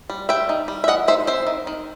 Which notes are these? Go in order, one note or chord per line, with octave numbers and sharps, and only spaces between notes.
G3
G3 E5 G5
D#4
G3
E5
E3 D#5 F#5
D#4 C5 E5
C4 C5 E5
D#3
D#3